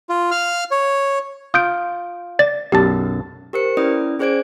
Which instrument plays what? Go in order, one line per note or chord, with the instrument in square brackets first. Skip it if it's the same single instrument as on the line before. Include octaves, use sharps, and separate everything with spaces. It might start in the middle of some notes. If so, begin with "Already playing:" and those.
[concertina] F4
F5 F6
C#5
[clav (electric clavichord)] F4 [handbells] D#6 G6 D7
[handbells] D5 A6
[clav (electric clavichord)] B1 F#2 A5 [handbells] G4
[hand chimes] G4 A#4 C5 C#7
C#4 E4 B4 D5 D#6
C#4 G#4 C5 D5 G#6 D7